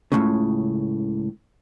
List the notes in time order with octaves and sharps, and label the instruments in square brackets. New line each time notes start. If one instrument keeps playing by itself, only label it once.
[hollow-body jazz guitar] C#2 F#2 A2 C#3